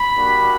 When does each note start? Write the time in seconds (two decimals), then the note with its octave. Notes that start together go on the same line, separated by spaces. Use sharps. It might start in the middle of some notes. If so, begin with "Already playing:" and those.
Already playing: B5
0.15 G3 A#3 D4 F#4